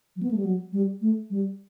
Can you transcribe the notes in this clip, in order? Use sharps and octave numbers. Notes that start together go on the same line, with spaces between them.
F#3
B3
A3
G3
F#3
G3
A3
G3